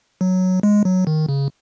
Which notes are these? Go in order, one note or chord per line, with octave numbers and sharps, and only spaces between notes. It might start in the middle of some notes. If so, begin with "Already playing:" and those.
F#3
G#3
F#3
D#3
C#3